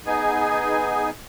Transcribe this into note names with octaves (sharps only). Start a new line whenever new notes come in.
B3 D#4 G#4 G#5